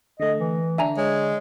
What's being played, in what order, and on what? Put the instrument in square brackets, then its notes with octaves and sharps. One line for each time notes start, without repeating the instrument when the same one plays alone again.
[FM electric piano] D3 A3 [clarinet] D#5
[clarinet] E3
[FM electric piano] D3 D4 [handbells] E5 G#5 A#5
[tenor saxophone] G#3 [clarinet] C#5